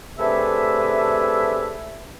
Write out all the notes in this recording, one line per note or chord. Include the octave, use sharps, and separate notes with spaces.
C3 A3 D4 G#4 B4 E5